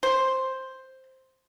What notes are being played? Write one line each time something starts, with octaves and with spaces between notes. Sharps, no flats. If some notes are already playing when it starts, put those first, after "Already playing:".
C5